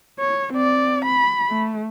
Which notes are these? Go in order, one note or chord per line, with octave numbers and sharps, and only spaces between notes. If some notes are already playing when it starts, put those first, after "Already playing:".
C#5
C4 D5
B5
A3